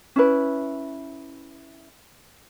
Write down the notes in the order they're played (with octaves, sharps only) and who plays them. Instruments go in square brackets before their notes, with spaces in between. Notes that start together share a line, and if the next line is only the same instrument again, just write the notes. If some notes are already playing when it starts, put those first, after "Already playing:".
[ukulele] C#4 E4 B4